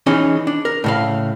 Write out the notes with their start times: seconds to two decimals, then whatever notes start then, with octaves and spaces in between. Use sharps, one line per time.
0.06 E3 C#4 D#4 G#4
0.47 D4
0.65 A#4
0.84 A2 C#3 F5